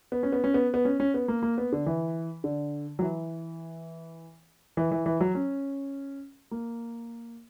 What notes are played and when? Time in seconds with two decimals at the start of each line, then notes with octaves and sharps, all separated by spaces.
0.12 B3
0.23 C#4
0.32 B3
0.44 C#4
0.54 B3
0.74 B3
0.85 C#4
1.00 C#4
1.14 B3
1.28 A#3
1.43 A#3
1.58 B3
1.72 D3
1.86 E3
2.44 D3
2.99 F#3
3.02 E3
4.77 E3
4.91 E3
5.06 E3
5.21 F#3
5.35 C#4
6.51 A#3